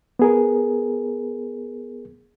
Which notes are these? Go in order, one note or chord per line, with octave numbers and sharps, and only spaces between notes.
B3 G#4 A#4